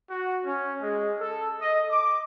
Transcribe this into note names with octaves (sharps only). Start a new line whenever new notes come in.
F#4
C#4
G#3
A4
D#5
D6